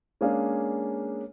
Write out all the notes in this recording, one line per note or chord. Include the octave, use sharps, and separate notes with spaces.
G#3 A#3 C#4 D4 G#4 F5